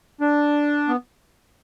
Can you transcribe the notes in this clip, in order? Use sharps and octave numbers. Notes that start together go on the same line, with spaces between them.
D4
B3